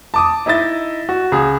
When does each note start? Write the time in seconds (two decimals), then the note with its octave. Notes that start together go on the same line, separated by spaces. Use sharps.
0.14 A5 D6 D#6
0.46 D#4 E4 D#5 E5 A6
1.09 F#4
1.32 C#2 G#4